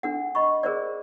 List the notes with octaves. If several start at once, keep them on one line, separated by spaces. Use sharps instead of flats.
D4 A4 F#5
D#5 B5 C#6
G#4 A#4 C5 D5